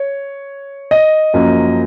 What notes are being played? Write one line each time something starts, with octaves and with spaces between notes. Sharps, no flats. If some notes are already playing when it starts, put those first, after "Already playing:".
Already playing: C#5
D#5
F#2 F3 A#3